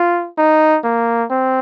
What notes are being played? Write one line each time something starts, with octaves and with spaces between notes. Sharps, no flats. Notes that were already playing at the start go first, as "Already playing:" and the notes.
Already playing: F4
D#4
A#3
C4